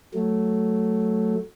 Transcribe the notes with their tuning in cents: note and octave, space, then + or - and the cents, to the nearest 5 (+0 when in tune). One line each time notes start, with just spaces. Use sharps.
F#3 +0 A3 +0